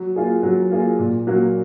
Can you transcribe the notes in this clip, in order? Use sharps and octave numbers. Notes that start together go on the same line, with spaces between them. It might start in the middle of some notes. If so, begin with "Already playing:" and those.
Already playing: F#3
A#3 F4 G#4
F#3
A#3 F4 G#4
A#2
F#3 A#3